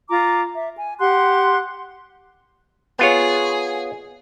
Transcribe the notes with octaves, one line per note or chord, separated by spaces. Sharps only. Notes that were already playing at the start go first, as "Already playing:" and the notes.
F4 A#5 D6
E5
G#5
G4 F#5 C6 F#6
B3 F4 G#4 C#5